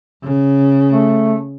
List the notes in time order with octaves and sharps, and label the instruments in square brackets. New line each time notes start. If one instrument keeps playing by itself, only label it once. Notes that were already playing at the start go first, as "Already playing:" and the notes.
[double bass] C#3
[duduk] A3